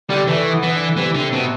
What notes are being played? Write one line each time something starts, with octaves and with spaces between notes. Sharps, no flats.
D3 G3
E3 A3
B3
E3
D3
C3 E3
D3
B2